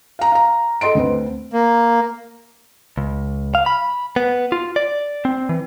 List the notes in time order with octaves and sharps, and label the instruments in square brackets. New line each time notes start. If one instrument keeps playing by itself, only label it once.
[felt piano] F5 A#5
F5 A#5
A4 D#5 C6 D7
D2 C4 B4
[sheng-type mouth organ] A#3
[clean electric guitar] C#2
F5
B5
B3
F4
D5
C4
E3